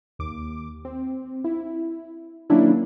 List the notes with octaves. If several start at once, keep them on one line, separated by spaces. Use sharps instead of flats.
D#2 D6
C4
E4
D#3 F#3 A#3 C#4 D4 E4